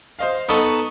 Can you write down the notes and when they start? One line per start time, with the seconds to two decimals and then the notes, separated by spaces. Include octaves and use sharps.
0.19 C5 D#5 F5
0.49 B3 D#4 A4 C#6 D#6